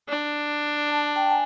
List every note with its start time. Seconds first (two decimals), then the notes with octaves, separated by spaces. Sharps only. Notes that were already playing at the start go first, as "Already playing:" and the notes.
0.08 D4
0.91 A5
1.16 G5 A5
1.30 G#5